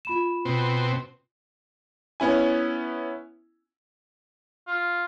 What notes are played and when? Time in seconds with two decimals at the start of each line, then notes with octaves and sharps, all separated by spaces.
0.05 F4 B5 E7
0.45 B2 C4
2.20 B3 C#4 E4 G#5
4.67 F4